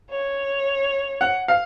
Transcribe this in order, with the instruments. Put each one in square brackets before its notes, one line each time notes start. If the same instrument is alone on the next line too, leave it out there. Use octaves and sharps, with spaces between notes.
[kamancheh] C#5
[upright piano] F#5
F5